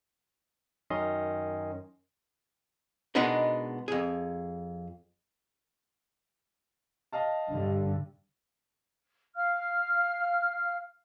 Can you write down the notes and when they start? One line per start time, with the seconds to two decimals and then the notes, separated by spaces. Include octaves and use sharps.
0.90 F#2 D#3 C#4 D#5 C6
3.15 B2 G#3 B3 D4 D#4 A#4
3.88 F2 G#4
7.12 D#5 F5 A5
7.50 G2 D3
9.35 F5 F6